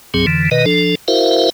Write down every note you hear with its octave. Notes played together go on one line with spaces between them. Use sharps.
C2 G2 F#3 C4 G#4
F2 D3 E3
B2 D#3 B4 D#5
F3 D4 A4
E4 F#4 A#4 C5 E5 F5